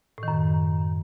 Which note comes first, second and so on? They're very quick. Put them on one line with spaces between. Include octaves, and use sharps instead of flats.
A2 D#3 F#2